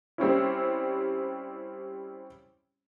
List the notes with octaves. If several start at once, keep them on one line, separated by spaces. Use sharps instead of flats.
G3 C4 C#4 E4